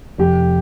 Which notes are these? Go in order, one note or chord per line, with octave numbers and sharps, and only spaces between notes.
F1 G4